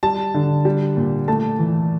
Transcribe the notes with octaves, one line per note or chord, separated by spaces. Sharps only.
G3 A5
D3
G3
A#2
A3 A5
E3